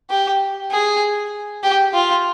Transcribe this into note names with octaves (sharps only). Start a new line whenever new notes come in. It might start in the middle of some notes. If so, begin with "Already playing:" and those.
G4
G#4
G4
F4